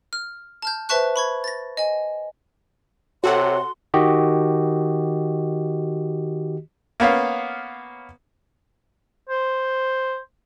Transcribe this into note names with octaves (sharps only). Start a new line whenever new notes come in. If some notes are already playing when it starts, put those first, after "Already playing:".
F6
A5 F6 G6
B4 C5 E5 A5 C#6 F#6
B5 C#6 G#6
A6 A#6
D#5 G#5
C3 F#4 A4 C#5 F#5 C6
D#3 F#4 G4 D#5
A#3 B3 C#4 F5
C5